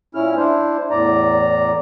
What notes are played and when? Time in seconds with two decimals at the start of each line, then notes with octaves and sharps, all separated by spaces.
0.15 A#2 C#4 E4 F6
0.36 D4 E4 C5
0.90 E2 A2 D5 A#5